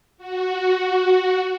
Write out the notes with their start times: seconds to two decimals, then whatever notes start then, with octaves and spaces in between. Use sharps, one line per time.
0.18 F#4